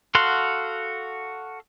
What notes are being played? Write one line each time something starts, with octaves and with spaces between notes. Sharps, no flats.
F#4 A4 F5 F#5 C6